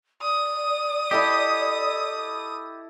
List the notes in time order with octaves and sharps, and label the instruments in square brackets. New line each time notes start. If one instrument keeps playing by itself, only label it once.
[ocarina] D5 [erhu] D#6
[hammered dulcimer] E4 A4 D#5 [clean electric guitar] G4